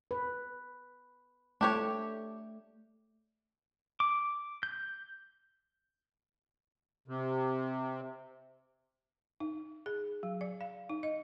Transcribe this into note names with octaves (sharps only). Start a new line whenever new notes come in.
B4
A3 D4 G4 C#5
D6
G6
C3
D#4
G#4
F#3
D5
F5
D#4
D#5